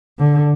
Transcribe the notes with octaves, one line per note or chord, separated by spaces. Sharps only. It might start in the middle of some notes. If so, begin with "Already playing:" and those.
D3